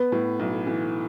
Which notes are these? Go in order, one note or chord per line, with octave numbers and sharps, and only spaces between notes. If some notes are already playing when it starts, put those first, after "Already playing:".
Already playing: B3 B4
A2
B1
E3